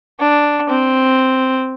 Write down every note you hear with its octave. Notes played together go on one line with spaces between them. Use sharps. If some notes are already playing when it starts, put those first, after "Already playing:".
D4
C4